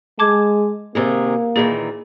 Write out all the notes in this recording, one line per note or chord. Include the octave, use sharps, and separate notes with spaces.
G#3 A5 D6 G#6
C3 D#3 A#3 G#4
A#2 D#3 E3 G#4